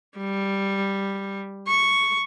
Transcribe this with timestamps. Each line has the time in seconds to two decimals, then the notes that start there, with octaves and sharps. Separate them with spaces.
0.17 G3
1.67 C#6